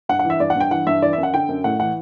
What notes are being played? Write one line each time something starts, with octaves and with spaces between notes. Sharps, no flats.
G2 F#5
F#5
E3
E5
G2 D5
F#5
G2 G5
E3 F#5
G2 E5
E3 D5
E5
F#2
F#5
D3 G5
F#2
A2 F#5
E3 F#5